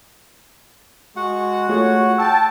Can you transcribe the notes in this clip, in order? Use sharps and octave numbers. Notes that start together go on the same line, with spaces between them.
G#3 F#4 F#5
A3 F4 G#4 C#5
G5 A5 E6